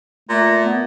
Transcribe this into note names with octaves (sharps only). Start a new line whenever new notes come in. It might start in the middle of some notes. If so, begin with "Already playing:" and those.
A#2 A3
B3